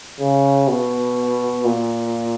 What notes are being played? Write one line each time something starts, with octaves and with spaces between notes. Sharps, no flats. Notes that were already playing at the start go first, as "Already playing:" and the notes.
C#3
B2
A#2